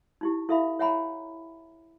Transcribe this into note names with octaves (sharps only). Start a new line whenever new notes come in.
D#4 E4 G4
E4 A4 E5 F5 B5
C#5 E5 F#5 G#5 A#5 B5